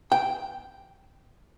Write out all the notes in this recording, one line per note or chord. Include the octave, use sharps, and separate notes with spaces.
G5